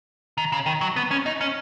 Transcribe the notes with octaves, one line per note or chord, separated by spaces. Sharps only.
D#3
C#3
D#3
F#3
B3
C#4
D#4
C#4